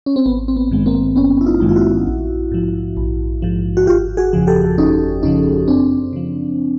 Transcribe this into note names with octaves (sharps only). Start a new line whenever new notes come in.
C#4
C4
G#1 B3
C4
B3
G2 D#3 G#3
A#3 C4
G#1 B3 C#4
E4
D#4 F4
G2 D#3 G#3
F4
E4 F#4
A#1
G#2 F3
A#1
G#2 F3
F#4
G1 F4 G4
F#4 G#4
F2 C#3 F3
G4 A4
G1 C#4 D#4
F2 C#3 F3 C#4 D#4
F#2 C4 D4
C#3 F3